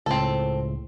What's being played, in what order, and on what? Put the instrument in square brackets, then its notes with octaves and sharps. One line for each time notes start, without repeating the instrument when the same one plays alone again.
[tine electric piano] C#2 A2 [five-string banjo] C4 A4